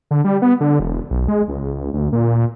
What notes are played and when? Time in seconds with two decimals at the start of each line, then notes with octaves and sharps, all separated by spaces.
0.11 D3
0.24 G3
0.42 B3
0.61 D3
0.80 E1
1.11 B1
1.28 G#3
1.48 C#2
1.93 D2
2.12 A#2